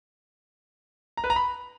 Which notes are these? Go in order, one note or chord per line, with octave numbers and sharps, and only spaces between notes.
A#5
B4
A#5
B5